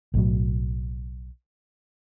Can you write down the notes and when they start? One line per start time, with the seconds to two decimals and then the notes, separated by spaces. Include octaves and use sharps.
0.14 B1 A2 F#3